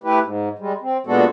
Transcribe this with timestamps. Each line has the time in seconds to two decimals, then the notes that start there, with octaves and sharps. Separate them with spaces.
0.04 A3 E4 G4 B4
0.22 G#2
0.59 G3 G#3
0.82 C4
1.07 A#2 G#3 B3 D4 F#4 A4